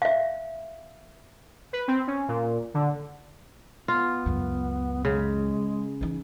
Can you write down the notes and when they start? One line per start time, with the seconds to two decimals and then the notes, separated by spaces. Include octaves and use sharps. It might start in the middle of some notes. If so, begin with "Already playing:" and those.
0.02 E5 F5
1.73 B4
1.88 C4
2.07 C#4
2.28 A#2
2.74 D3
3.88 B3 F4
4.26 C#2 F#2
5.05 C#3 G#3
6.01 E3 D#4